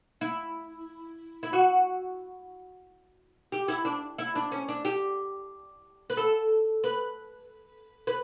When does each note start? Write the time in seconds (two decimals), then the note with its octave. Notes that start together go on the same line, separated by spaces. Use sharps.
0.21 E4
1.43 E4
1.53 F#4
3.52 G4
3.68 E4
3.85 D4
4.18 E4
4.35 D4
4.52 C#4
4.69 D4
4.85 G4
6.10 B4
6.17 A4
6.84 B4
8.07 B4